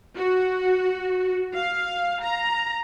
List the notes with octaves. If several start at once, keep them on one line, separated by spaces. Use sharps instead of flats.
F#4
F5
A#5